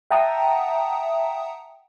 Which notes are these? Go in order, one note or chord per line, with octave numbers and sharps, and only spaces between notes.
E5 F#5 G5 A5 A#5 D#6